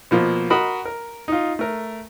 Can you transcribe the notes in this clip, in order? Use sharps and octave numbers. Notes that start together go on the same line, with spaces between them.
B2 F3 A#3
F#4 A#4 D#5 B5
A#4
D#4 F4
A3 A#4